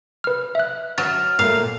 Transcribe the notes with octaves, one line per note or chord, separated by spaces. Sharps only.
B4 F6
E5 F#6
F#3 F6 A6
A#2 A3 F5